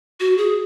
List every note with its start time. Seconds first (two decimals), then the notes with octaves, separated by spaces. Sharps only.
0.20 F#4
0.38 G#4